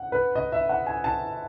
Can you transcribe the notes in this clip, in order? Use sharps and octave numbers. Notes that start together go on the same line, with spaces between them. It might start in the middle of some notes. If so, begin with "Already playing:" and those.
Already playing: F#5
B4
D#5
E5
F#5
G#5
A5